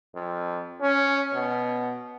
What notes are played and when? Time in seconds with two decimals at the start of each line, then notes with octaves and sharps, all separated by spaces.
0.16 F2
0.82 C#4
1.34 B2